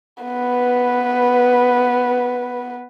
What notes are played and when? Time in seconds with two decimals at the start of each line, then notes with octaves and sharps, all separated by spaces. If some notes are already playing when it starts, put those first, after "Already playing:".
0.24 B3 B4